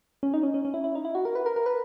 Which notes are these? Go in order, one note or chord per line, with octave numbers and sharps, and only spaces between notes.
C#4
D#4
C#4
C#4
C#4
E4
E4
D#4
E4
F#4
A#4
B4
A#4
A#4
B4